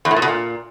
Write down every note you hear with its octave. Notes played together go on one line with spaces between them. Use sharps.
E2
A2
A#2
B2
A#2